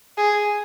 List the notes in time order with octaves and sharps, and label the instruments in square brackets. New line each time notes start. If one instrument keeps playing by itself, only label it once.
[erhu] G#4